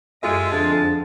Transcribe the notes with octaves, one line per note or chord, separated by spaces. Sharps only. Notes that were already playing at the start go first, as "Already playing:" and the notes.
F#2 G#3 F4 G4 A4 D#5 E5
F2 D3 A4 A5 C6